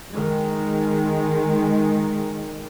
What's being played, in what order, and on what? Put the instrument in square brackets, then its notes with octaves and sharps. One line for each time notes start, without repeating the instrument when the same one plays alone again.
[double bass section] D#3 G#3